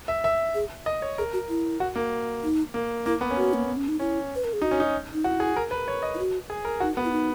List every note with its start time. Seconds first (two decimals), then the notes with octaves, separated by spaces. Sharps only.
0.08 E5
0.24 E5
0.55 G#4
0.86 D#5
1.02 C#5
1.18 G#4 A#4
1.33 F#4
1.49 E4
1.80 F#4
1.96 A#3
2.44 D#4
2.74 A#3
3.06 A#3 E4
3.21 B3
3.31 C#4
3.36 B3 F#4
3.54 A#3
3.65 B3
3.76 C#4
3.88 D#4
3.99 C#4 E4
4.35 B4
4.44 A#4
4.53 G#4
4.62 D#4 F#4
4.71 C#4
4.80 D#4
5.13 D#4
5.24 E4 F#4
5.40 G#4
5.56 A#4
5.71 B4
5.88 C#5
6.03 D#5
6.14 E4
6.19 F#4
6.50 G#4
6.65 A#4
6.80 D#4 F#4
6.97 B3
7.05 E4
7.12 D#4